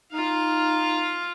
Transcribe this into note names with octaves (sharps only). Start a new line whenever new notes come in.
D#4 F4 F5